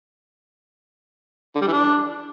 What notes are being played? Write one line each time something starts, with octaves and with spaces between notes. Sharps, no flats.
D3
G3
E3
D4